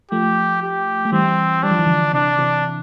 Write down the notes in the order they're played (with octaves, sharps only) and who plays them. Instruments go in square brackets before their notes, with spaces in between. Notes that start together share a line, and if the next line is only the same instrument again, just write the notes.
[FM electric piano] F3 A3 [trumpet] G4
[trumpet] G4
[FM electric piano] A3
[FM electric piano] E3 G3 [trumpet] C4
[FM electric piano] G3 [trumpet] D4
[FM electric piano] F3
E3
D3 F3
[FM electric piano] C3 E3 [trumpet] D4
[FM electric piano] C3 E3